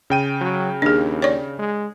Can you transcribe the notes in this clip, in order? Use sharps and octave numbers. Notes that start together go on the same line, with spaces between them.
C#3 G5 D#7
F#3
D#2 D4 G#4
C#5 D5
G#3